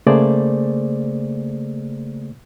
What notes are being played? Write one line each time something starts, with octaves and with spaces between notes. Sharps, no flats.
C#3 A3 A#3 G#4 C5 D5